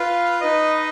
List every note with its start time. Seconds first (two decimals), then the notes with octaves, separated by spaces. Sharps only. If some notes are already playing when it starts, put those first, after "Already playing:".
Already playing: F4 B4 F5
0.41 D#4 B4 D#5